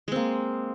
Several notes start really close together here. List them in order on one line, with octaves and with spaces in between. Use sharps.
G#3 C4 A#3